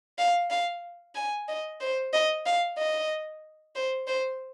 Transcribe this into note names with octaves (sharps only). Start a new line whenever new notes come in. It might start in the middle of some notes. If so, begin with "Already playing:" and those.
F5
F5
G#5
D#5
C5
D#5
F5
D#5
C5
C5